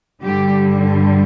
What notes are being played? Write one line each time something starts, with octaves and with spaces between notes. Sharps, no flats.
G2 D3 G3 G4